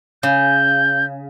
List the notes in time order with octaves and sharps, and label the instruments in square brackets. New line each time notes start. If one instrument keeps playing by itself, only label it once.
[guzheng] C#3 [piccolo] G6